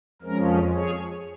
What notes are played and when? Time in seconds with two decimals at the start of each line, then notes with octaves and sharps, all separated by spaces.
0.22 F2 F3 G#3 C#4 A#4
0.75 G#4 C#5